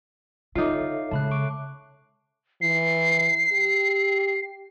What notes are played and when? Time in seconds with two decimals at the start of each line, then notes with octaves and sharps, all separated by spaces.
0.55 D3 D#4 F4 A4 C#5 E5 D6 C7
1.11 C#3 G#3 A5 B5 F#6
1.31 C#6 D6 D7
2.61 E3 C7
3.52 G4